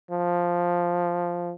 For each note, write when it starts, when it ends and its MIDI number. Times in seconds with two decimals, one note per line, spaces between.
0.11 1.53 53